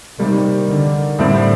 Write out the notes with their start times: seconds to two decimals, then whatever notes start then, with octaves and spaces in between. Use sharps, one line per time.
0.18 C3 D#3 G3 A#3
0.69 D3
1.19 A2 D3 G3 C4